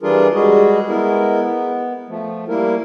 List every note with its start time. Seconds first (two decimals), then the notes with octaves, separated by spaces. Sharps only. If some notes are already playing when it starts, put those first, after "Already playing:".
0.02 E3 G3 D4 F4 G#4 A#4
0.34 G3 G#3 F#4 G#4
0.89 G#3 B3 E4 A#4
1.40 B3
2.09 F3 A3
2.48 G3 A#3 E4 A#4